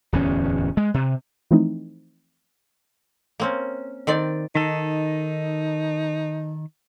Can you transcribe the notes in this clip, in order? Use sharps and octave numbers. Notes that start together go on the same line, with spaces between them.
D1 E2 C#4
G#3
C3
E3 F3 A3 C4 D#4 E4
A#3 C4 C#4
D#3 C4 D5
D#3 D#4 A4